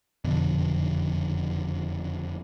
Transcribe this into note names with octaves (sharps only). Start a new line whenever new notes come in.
F#1 F2 B2 D3